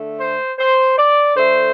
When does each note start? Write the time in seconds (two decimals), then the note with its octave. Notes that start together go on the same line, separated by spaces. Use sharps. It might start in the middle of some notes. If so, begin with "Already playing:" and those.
Already playing: D3 A3
0.20 C5
0.59 C5
0.97 D5
1.36 D3 A3 C5